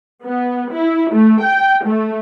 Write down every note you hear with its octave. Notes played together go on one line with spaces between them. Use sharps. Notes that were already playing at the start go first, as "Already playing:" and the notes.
B3
E4
A3
G5
A3